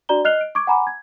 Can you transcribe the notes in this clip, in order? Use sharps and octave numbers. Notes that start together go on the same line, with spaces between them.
D4 F#4 D5 A#5 G7
D#5 F6 F#6 C7 F7 G7
D7
C#6 D6 G#6 D7
F#5 G#5 A#5 B5 D6
G#6